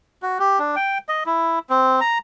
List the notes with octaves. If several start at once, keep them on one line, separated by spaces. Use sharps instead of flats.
F#4
G4
D4
G5
D#5
E4
C4
A#5